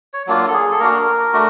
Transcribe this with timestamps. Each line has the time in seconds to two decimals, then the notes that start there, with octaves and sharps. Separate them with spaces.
0.14 C#5
0.27 F#3 A#3 D4 F4
0.48 A4
0.54 G#4
0.71 A4
0.80 A#3 D4 F#4 A#4
1.33 A3 D4 F#4